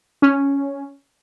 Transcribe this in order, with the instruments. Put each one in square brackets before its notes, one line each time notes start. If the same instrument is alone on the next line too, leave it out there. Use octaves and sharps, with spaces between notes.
[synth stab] C#4